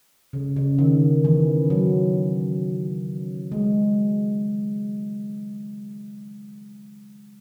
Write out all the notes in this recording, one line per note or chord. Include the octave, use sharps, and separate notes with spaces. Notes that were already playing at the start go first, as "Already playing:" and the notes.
C#3
C#3
D#3
E3
F#3
G#3